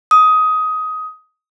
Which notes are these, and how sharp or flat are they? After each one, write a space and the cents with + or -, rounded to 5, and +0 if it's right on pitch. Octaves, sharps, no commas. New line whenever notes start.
D#6 +15